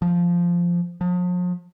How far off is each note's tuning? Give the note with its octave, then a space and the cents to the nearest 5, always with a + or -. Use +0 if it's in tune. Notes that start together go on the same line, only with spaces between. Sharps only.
F3 -5
F3 +40